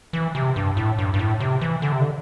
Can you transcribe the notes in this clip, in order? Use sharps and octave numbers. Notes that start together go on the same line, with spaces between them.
E3
C3
G2
A2
G2
G2
A2
C3
E3
D3
C3
D3